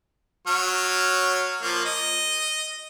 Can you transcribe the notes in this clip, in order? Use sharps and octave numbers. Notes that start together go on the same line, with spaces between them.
F#3 C#5 F6
F3 A#3
D#5